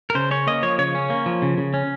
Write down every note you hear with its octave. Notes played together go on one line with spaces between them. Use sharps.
A#4
C#3 C5
C#4 C#5
A#3 D#5
F3 C#5
C#3 C#5
C#4
A#3
F3
C#3
C#3
C#4